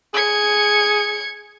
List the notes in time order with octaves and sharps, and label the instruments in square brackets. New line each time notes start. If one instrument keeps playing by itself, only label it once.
[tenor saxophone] G#4 [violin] G#6 C#7